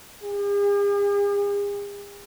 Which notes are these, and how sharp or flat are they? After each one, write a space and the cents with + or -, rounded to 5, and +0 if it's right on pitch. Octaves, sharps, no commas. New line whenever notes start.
G#4 -45